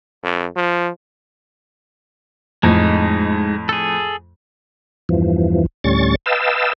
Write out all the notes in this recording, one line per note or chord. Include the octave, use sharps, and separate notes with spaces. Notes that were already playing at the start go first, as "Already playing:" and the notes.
F2
F3
F2 A2 G#3 D#4
G#4 A4
E2 G2 E3 F3
D2 A2 G3 C#4 C#6 A6
B4 D#5 F5 G5 A5 E6